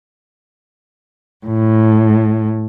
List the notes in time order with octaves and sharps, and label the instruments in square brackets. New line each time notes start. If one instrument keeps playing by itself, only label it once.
[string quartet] A2